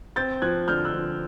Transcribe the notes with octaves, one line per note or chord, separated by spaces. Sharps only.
C4 G6 A6
F3 F#6 G#6
D3 F6 G6
E6 F#6
F3